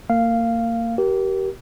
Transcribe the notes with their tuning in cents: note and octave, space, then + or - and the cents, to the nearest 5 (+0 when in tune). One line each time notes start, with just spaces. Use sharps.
A#3 -30 F5 -10
G4 -25 A#4 +20